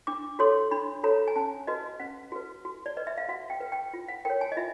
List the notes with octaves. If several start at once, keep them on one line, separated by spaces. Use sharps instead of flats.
D4 D6
F#4 A4 C#5 C6
D4 B5
F#4 A4 C#5 A#5
G#5
C#4 A5
F#4 B4 D#5
C#4 F#5
F#4 B4
F#4
D5
B4 D#5
E5
F5
F#4 F#5
G5
B4
G5
F4
F#5
A#4 C#5 G5
G#5
D#5
F4 E5